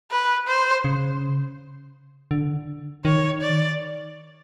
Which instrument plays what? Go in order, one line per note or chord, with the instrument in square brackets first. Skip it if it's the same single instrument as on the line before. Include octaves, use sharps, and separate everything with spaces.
[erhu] B4
C5
[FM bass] C#3
D3
[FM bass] D#3 [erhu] C#5
[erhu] D5